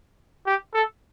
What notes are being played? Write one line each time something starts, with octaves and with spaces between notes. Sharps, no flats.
G4
A4